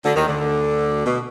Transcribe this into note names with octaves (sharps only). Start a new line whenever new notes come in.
D2 D3
D#2 D#3
D2 D3
B2